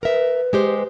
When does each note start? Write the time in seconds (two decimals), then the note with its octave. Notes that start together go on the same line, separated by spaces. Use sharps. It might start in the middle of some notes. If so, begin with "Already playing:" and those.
0.03 A#4 B4 E5
0.53 G#3 G4 C5